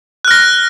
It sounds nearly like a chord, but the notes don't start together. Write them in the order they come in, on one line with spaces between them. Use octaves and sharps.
F#6 F6 A#6